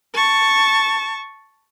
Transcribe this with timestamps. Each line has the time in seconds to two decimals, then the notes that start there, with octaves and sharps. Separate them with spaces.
0.14 A5 C#6